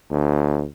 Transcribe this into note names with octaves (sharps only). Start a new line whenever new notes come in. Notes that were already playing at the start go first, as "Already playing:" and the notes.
D2